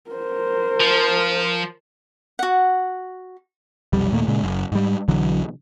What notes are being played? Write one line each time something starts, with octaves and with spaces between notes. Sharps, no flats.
A#4 C5
F3
F#4 F#5
F1 B1 F2 G3
D#2 A#2 A3 A#3
A#2 C#3 G#3
F#1 F#2
G#2 G3
B1 D3 E3 F#3